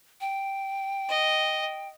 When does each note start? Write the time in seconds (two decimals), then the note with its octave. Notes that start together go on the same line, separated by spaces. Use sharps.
0.21 G5
1.09 D#5